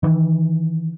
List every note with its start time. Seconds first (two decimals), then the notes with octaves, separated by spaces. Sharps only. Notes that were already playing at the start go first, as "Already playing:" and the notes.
0.03 D#3 E3